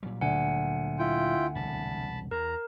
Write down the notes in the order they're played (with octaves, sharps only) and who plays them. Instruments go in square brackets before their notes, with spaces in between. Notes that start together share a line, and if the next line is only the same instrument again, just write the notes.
[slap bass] A#2 F#3 G3
[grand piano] D2 D5 [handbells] F#5 G#5
[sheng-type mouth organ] E4 F4 G5
[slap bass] E1 C2 [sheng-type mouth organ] A5 B5
[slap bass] E2 [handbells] A#4 [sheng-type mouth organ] A#5